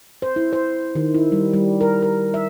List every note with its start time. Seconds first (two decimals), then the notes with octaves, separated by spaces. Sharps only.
0.22 C5
0.36 E4
0.53 C5
0.95 D#3
1.14 E4
1.32 G3
1.53 G3
1.81 A#4
2.02 A#4
2.34 E5